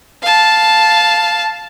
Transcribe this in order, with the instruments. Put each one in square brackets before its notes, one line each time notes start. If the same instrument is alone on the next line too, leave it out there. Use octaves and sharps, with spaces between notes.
[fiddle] F5 A5